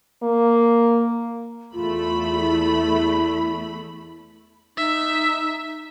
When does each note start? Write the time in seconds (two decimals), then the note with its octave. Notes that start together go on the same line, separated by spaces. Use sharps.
0.23 A#3
1.74 E2 A3 F4 B5
2.40 E4
4.77 D#4 E5